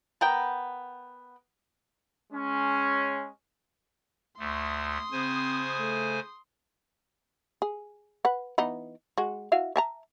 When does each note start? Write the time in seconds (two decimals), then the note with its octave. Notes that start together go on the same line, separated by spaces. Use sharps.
0.21 B3 A#4 G5
2.33 G#3 C#4
4.39 D2 A3 C6 D#6
5.12 C#3 C4 C5 G#5
5.79 A3
7.62 G#4
8.25 B4 F#5
8.58 E3 B3 D#4
9.18 G#3 F#4
9.52 E4 F#4 F5
9.76 E5 A5 A#5